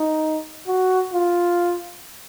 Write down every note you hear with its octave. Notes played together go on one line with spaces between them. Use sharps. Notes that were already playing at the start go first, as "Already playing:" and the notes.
Already playing: D#4
F#4
F4